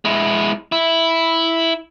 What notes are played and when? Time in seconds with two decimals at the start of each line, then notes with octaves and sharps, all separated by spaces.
0.05 G#3 E4
0.72 E4